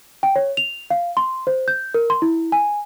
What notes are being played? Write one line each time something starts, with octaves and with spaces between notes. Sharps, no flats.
G5
C#5
F7
F5
C6
C5
G6
A#4
C6
E4
G#5